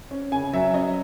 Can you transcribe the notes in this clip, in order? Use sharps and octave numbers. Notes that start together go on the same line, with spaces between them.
C#4
C#3 G#5
F#3 E5
C#4 D#5